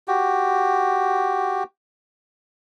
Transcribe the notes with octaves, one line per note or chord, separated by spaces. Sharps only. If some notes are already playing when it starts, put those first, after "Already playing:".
F#4 G4